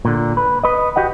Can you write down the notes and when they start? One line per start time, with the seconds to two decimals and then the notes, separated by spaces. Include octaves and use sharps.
0.05 A#2 D3
0.37 B4
0.64 B4 D#5
0.96 F#4 G4 D#5 F#5